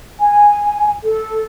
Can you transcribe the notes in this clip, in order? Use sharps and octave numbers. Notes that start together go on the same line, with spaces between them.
G#5
A4